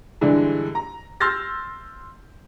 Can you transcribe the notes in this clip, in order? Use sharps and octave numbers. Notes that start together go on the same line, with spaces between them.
G2 D3 E3 G#3
A#5
C6 E6 F6 G6 A6 A#6